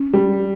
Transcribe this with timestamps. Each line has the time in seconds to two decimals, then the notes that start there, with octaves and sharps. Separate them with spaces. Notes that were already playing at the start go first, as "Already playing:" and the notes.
Already playing: C#4
0.14 G3